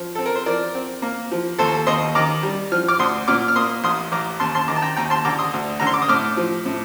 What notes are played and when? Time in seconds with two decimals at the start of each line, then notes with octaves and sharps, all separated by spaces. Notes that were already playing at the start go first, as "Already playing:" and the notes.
Already playing: F3
0.15 C4 A4
0.26 A#4
0.36 C5
0.46 F3 A#4 D5
0.75 C4
1.02 A#3
1.32 F3
1.59 D#2 A4 C5
1.87 D#2 C5 D#5
2.15 D#3 A#5 D6
2.43 G3
2.72 F3 F6
2.88 D6 F6
2.99 D2 C6 D#6
3.28 A#2 D6 F6
3.48 F6
3.56 A#3 C6 D#6
3.84 A1 C6 D#6
4.12 A1 A#5 D6
4.40 D#2 A5 C6
4.55 A5 C6
4.68 D#3 A#5 D6
4.76 A5
4.82 G5 A#5
4.96 D#2 G5 A#5
5.10 A5 C6
5.25 D3 A#5 D6
5.39 C6 D#6
5.53 D2
5.80 D3 A#5
5.87 C6
5.94 D6
6.02 D#6
6.09 A2 D6 F6
6.37 F3
6.66 A2